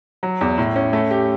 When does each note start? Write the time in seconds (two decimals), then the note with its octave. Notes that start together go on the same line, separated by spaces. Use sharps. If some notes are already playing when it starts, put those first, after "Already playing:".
0.23 F#3
0.41 E2
0.58 A2
0.76 C#4
0.93 A3
1.11 G4